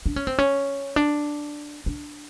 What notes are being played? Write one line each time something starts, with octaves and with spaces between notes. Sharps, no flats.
D4
C#4
C4
C#4
D4
D4